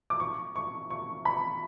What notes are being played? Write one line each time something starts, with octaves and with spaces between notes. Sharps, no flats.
D6
C#6
C#6
C#6
B5